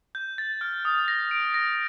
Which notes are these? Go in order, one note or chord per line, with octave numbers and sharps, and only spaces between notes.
G6
A6
F6
D#6
A#6
D7
A#6